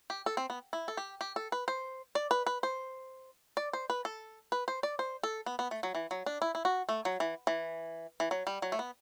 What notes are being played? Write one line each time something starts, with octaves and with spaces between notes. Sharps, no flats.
G4
A4
C4
B3
E4
A4
G4
G4
A4
B4
C5
D5
B4
B4
C5
D5
C5
B4
A4
B4
C5
D5
C5
A4
B3
B3
A3
F#3
E3
F#3
D4
E4
E4
F#4
A3
F#3
E3
E3
E3
F#3
G3
F#3
A3
B3